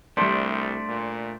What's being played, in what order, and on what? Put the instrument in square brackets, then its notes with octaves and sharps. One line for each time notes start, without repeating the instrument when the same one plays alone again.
[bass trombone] C2 [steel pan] G3 D5 [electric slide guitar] A3 D4 [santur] C5
[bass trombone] A#2